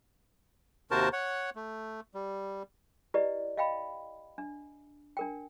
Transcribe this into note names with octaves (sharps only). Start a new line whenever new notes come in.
D#2 C3 F#4 A#4 C5 A5
C#5 F#5
A3
G3
E4 G4 B4 D5 D#5
D#5 F5 G5 B5
D4
D4 A#4 G5